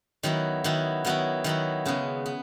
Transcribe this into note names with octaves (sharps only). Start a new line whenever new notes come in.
D#3 F#3 B3 E4
D#3 F#3 B3 E4
D#3 F#3 B3 E4
D#3 F#3 B3 E4
C#3 G#3 B3
B3